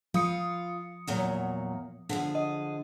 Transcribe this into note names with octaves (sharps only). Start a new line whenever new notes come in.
F3 F4 D#6 C#7
E2 A#2 F#3
D3 F3 G#4
D#5